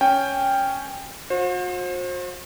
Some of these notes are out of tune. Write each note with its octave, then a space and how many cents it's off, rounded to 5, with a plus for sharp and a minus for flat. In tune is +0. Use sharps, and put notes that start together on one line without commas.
C#4 +0 G5 +10
F#4 -45 C5 +30